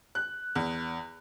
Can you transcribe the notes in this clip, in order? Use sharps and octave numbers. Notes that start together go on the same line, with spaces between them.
F#6
E2